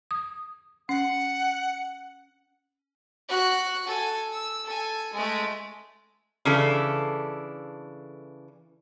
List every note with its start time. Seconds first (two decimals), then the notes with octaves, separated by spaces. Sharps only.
0.11 D#6
0.89 C#4 F#5
3.29 F#4 F#6
3.87 A4 G#5
4.31 E6
4.65 A4 G#5
5.13 G#3 A3
6.45 C#3 E3 D4 A4